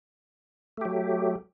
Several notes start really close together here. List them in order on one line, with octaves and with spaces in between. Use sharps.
A3 G4 F#3